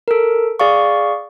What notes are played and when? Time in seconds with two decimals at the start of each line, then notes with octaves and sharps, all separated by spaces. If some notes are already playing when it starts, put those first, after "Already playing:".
0.08 A4 A#4
0.60 G#4 D5 F5 C#6